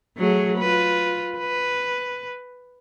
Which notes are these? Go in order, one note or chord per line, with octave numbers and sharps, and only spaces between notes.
F#3 A3 G#4
F4 B4
B4